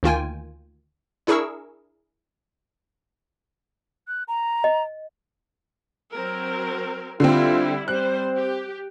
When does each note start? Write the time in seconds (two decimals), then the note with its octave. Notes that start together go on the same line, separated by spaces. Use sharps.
0.03 D2 D#3 A#3 F4 G5 G#5
1.27 D4 E4 G#4 A#4 C#6 E6
4.08 F#6
4.28 A#5
4.64 D#5
6.13 F#3 C4 A#4
7.20 D3 G3 C4 E4 F4
7.88 G3 C4 C5 F#6
8.37 G4